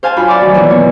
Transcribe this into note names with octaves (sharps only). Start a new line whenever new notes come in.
C5 F5 G#5 A5
F#2 F4 B5
D5 E5 D6
D#3 F#3
B2 E3 F#3
B3 C#5